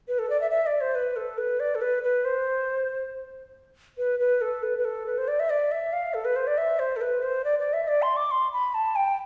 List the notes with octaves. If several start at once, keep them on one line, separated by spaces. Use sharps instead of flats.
B4
A4
D5
E5
E5
D5
C5
B4
A4
B4
D5
A4
B4
B4
C5
B4
B4
A4
B4
B4
A4
B4
C5
D5
E5
D5
E5
F5
A4
B4
C5
D5
E5
C5
A4
B4
C5
D5
D5
E5
D5
C6
D6
C6
B5
A5
G5